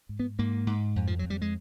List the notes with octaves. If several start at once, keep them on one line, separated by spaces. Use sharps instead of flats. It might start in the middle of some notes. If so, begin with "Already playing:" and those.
G#2
B3
G#2 A#3
G#2
F2
F3
F2 F#3
G3
G#3